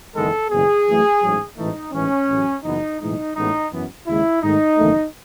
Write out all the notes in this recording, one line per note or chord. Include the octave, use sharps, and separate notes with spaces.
F#1 E2 D#3 G#3 B3 A4
F#1 E2 B2 G#4
F#2 E3 A3
A1 G#2 F#3
A1 G#2 E3 A3 D#4
A1 G#2 E3 C#4
A1 A2 F#3
F#1 F#2 E3 B3 D#4
B1 A2 E3 G#3 D#4
A1 A2 G#3 B3 D#4
F#2 E3 B3
D#2 C#3 G#3 E4
G#2 D#3 A3 D#4
F#1 E2 D#3 A3